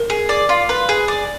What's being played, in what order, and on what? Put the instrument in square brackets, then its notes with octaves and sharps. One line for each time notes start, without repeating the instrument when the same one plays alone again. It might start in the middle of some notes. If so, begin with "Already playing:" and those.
Already playing: [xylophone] A#4
[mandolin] G#4
D5
F4
B4
G#4
D5